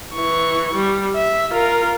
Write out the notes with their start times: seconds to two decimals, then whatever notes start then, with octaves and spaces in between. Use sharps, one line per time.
0.14 E3 C#6
0.74 G3
1.16 E5
1.51 F4 A#4